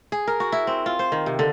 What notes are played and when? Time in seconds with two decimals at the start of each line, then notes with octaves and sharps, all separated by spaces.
0.12 G#4
0.27 A#4
0.40 F#4
0.52 E4
0.67 C4
0.86 F4
0.99 C5
1.12 D#3
1.26 C3
1.39 D3